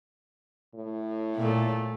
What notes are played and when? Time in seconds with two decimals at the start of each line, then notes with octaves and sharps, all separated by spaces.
0.75 A2
1.36 A#2 A3